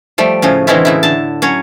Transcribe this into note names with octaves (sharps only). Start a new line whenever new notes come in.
F3 G3 A3 G5
A2 C#3 F3 C#4
D3 E3 G#3 C4 C#4 E4
A2 C#3 E4
D3 A5
F#3 C#4 C#5